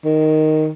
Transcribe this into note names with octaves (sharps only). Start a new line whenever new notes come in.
D#3